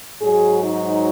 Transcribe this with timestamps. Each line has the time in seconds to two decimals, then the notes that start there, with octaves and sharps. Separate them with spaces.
0.21 G#2 F#3 G#4
0.65 D#4